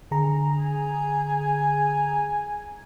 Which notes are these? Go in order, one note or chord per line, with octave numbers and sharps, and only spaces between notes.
D3 G#4 A#5
G#5